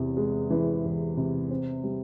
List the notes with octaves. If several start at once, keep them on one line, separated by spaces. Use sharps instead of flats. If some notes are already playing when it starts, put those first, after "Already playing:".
Already playing: E2 C3 E3
G#3
E3
E2
C3
C4
G3